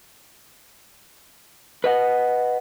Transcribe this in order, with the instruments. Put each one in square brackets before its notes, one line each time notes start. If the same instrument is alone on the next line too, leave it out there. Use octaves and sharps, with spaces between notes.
[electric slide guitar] B4 D#5 F#5